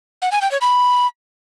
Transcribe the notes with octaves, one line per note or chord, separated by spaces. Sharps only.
F#5
G#5
G5
C#5
B5